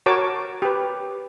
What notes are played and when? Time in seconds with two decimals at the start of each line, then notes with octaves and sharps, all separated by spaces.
0.06 F#4 A#4 C#5 A5 D6
0.62 G4 B4